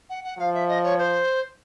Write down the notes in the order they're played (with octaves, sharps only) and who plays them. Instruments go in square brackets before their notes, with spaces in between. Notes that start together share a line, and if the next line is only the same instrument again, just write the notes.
[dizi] F#5
F#5
[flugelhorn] F3 [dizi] F5
[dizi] E5
D#5
C#5
C5